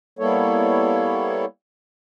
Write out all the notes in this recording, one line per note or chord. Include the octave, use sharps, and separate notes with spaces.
G3 A#3 B3 E4 A4 C#5